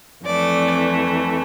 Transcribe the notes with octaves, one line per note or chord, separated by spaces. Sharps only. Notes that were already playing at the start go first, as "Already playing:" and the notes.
F2 E3 A3 D5